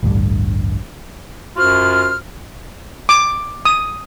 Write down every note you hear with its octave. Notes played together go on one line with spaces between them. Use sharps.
A1 D2 G2
F#2 F4 F#4 C5 F6
D6
D#6